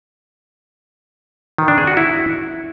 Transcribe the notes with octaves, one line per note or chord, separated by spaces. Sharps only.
D#3
D4
G#4
F#4
E4